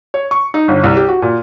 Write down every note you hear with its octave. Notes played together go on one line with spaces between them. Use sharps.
C#5
C#6
D#4
G1
C2
G4
F#4
A#2